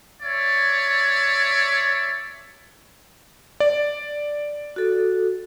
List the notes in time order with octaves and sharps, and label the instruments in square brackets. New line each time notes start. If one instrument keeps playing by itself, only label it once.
[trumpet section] C#5 D5 E5
[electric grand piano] D5
[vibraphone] F#4 A4